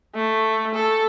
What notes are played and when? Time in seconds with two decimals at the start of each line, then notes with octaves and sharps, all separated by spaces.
0.15 A3
0.74 A4